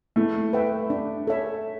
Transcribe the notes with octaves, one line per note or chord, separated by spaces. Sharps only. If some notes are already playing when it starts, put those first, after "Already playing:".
A3 E4
B4 E5 G5
D4
A4 C#5 E5